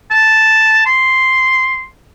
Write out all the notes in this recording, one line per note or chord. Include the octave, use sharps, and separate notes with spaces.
A5
C6